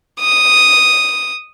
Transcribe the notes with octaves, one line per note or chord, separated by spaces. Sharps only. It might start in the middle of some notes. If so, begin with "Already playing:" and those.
D#6